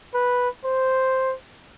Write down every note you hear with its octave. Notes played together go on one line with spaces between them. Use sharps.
B4
C5